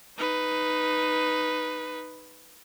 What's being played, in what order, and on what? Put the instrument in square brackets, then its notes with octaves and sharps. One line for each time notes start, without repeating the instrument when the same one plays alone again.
[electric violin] D#4 B4